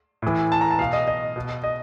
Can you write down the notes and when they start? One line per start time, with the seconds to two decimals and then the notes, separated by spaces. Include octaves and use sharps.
0.22 A2 E3
0.52 A5
0.61 A#5
0.71 A5
0.79 B2 F5
0.93 D#5
1.08 D#5
1.36 B2
1.64 D#5